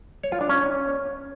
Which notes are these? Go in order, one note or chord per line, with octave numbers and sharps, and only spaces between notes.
C#5
F4
D4
C#4